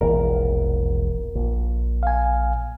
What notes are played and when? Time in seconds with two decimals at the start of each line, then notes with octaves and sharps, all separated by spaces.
0.01 E1 A#1 E2 A#4
1.35 A#1
2.03 F5 G#5